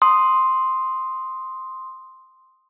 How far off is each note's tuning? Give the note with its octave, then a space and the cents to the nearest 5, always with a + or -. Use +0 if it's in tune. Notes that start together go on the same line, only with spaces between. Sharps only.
C6 +0 D#6 +0